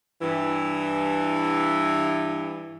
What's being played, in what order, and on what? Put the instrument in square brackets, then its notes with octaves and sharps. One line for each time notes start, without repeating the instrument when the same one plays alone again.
[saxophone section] G2 E3